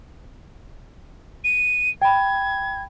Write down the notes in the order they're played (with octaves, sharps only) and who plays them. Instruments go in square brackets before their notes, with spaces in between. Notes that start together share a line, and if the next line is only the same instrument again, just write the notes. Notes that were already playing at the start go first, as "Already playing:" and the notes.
[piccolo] D#7
[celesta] G5 B5 [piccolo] G#6